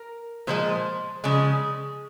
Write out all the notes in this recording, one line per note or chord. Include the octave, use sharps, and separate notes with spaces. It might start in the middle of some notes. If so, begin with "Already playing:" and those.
Already playing: A#4
A#2 F3 G#3 C5
C#3 F3 G#3 G#4